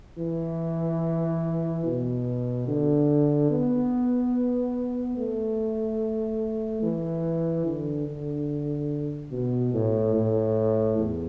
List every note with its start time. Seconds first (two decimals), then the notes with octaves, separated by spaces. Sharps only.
0.19 E3
1.85 B2
2.68 D3
3.51 B3
5.17 A3
6.83 E3
7.66 D3
8.07 D3
9.32 B2
9.73 A2
10.15 A2
10.98 E2